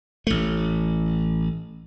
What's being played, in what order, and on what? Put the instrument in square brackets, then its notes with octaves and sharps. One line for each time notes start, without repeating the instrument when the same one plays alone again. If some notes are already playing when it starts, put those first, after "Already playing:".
[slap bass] A1 A3